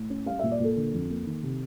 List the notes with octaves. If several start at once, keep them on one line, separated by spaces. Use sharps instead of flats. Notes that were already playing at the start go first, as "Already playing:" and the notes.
Already playing: A2
C#4
G3 F5
A#2 E5
D5
A#2 A4
D3
F2
A#3
D#3
C3